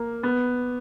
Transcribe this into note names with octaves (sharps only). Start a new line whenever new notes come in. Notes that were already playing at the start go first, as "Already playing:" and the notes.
Already playing: A#3
B3